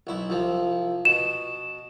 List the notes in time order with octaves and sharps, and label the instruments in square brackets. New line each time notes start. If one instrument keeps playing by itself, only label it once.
[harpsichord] B1 E4
C2 F3
[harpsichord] B2 [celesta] E7